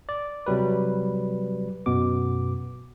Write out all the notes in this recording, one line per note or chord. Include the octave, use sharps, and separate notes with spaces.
D5
C3 F#3 G3 B4
F#2 B2 B3 D6